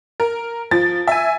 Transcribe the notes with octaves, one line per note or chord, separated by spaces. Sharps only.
A#4
F3 A6
E5 G#5